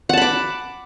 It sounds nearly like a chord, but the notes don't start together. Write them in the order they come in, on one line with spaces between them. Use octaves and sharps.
F#5 A5 B5 D6